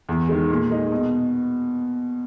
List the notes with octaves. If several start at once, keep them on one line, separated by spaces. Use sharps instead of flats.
E2
D#3 G#3
A#2
G#3 D#4
B2